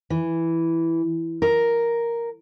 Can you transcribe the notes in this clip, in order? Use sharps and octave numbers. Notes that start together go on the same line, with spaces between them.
E3
A#4